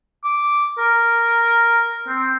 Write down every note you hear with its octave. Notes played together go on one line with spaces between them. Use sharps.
D6
A#4
C4